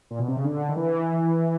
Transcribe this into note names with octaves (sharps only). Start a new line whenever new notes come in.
A#2
B2
C3
C#3
D3
D#3
E3